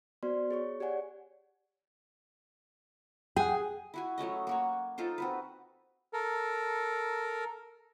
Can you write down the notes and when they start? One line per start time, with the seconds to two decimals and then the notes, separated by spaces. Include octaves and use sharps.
0.23 B3 F#4 C5 D5 C6
0.51 G#4 C#5 C#6
0.80 G4 C#5 D5 F#5 G#5
3.37 G#4 F#5 G5
3.94 E4 F#4 G#5
4.18 F#3 A3 C#4 D#5
4.47 A#3 F#4 C#5
4.98 D#4 F4 A4 C5
5.18 C4 F#4 B4
6.13 A4 A#4